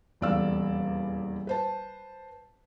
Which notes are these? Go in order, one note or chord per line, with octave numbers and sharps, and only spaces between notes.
D#1 E2 D5 F5 E6
B4 C5 A5